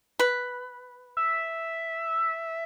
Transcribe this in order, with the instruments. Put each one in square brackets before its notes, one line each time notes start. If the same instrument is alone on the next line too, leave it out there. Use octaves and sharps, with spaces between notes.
[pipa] B4
[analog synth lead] E5